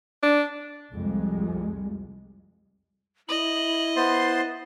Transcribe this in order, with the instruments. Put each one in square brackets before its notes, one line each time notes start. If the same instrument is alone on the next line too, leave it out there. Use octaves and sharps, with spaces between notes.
[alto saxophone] D4
[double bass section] C2 F2 G3 G#3
[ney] E4 [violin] D#5 [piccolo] F#7
[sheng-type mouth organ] B3 C5 C6 [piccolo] A6